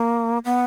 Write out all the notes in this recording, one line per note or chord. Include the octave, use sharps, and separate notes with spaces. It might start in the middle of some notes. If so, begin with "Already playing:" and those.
Already playing: A#3
B3